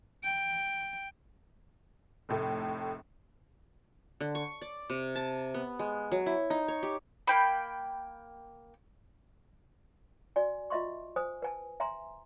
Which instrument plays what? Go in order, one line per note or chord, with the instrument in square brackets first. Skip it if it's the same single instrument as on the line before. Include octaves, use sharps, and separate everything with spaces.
[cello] G5
[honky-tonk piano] F1 A2 A3
[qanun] D3
C#6
D5
C3
A5
B3
G#3
F#3
E4
D#4
C#5
G4
[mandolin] A#3 G5 B5
[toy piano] F#4 D5 G#5
F4 D#5 E5 C6 C#6
C5 G#5 D#6
B4 G#5 A5
E5 G#5 A#5 C6